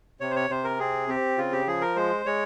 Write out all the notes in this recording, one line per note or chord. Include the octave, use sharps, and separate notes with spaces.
C3 C#5
C5
C#5
C3 C5
A#4
C4 G#4
C4 G4
C#3 F4
G4
F3 G#4
A#4
G#3 C5
G#3 C#5